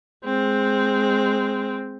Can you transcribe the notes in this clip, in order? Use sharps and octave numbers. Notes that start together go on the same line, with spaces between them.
G#3 C4